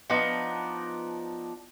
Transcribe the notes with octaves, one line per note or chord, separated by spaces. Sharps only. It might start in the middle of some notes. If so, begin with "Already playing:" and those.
F3 B3 D4 D#4